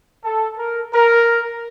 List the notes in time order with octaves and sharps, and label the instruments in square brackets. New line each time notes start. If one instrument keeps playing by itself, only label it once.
[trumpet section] A4
A#4
A#4